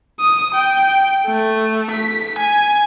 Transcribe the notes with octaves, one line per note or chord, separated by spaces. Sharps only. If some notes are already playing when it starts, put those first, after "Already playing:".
D#6
G5
A3
B6
G#5